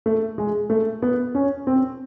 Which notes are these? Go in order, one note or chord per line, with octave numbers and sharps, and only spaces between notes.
A3
G#3
A3
B3
C#4
C4